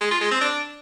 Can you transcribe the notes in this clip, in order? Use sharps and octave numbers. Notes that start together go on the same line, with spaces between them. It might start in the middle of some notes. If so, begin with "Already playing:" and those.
G#3
F4
G#3
C4
D4